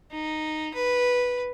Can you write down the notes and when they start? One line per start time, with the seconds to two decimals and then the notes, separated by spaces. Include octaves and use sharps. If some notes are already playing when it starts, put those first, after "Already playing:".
0.12 D#4
0.74 B4